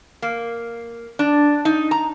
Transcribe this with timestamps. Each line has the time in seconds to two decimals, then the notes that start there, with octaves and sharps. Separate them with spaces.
0.22 A#3
1.19 D4
1.65 D#4
1.91 A#5